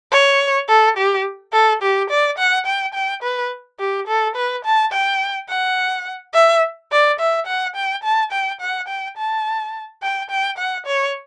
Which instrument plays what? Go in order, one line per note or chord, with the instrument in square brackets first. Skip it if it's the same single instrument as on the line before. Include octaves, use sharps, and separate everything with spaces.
[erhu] C#5
A4
G4
A4
G4
D5
F#5
G5
G5
B4
G4
A4
B4
A5
G5
F#5
E5
D5
E5
F#5
G5
A5
G5
F#5
G5
A5
G5
G5
F#5
C#5